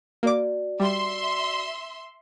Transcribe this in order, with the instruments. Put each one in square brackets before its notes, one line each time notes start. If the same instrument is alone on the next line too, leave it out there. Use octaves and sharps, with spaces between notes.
[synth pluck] A#3 D6 [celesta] F#4 D5
[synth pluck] G3 [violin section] E5 C6